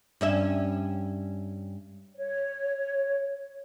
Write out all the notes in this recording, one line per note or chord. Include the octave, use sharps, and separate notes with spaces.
G2 C#4 E5
C#5